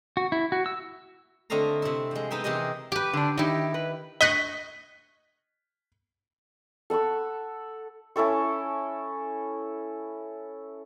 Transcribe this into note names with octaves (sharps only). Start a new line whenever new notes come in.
F#4
E4
F#4
E6
D3 A3 C4 D#5 F5 A#5
C3 E4
F3 G#3
G#3 B3 D#4 E5 G5
C3 E3 G4 G#4 A#4 D#5
G4 B4
D3 D4
D#3 D#4 E4 G4
B4
D#5 C#6 F#6 B6
A4 F#5 B5 C#6
C#4 E4 A4 C#6